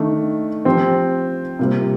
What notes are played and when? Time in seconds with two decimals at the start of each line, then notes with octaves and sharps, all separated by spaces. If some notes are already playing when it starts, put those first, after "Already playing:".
Already playing: D#3 A3 D4
0.65 F3 C4 G4 C5
1.59 C3 G3 A#3 F4